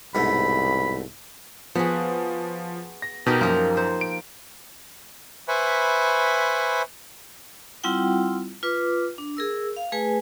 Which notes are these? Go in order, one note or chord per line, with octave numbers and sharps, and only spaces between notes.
C2 G#2 B2 A3 B5
F3 B3 F#4 G#4
A#6
B2 D#4 G4 A#4
F#2 F3 A#3
C5
D7
B4 C5 E5 G#5 B5 C#6
G3 C4 E4 F4 F#5 G5
F4 B4 D6
D4
G#4 A#4 E6
F5
A3 G#4 B4 G#5